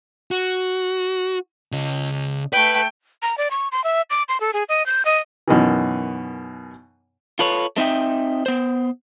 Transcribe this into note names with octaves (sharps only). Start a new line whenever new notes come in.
F#4
C#3 D#5
A3 B4 G5
A#5
D5
C#6
C6
E5
D6
C6
A4
G#4
D#5
G6
D#5
F#2 B2 D#3 E3
F4 A4 B4 C#5
A3 C4 D#4 E5 G5
B3 C5